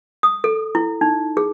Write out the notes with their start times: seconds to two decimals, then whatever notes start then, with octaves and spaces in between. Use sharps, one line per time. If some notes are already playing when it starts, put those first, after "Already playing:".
0.23 D#6
0.44 A4
0.75 E4
1.01 D#4
1.37 G#4